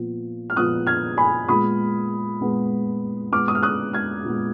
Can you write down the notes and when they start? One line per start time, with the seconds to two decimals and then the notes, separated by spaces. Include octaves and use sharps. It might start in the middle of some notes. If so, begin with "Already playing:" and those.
Already playing: A#2 F3 B3
0.50 F6
0.56 A#2 F3 B3 D#6 F#6
0.87 F6 G#6
1.17 G#5 B5
1.48 A#2 G#3 B3 B5 D#6
2.40 A#2 G#3 B3
3.32 A#2 G#3 B3 D6 F6
3.48 D#6
3.55 F6
3.63 D#6 F#6
3.93 F6 G#6
4.24 A#2 G#3 B3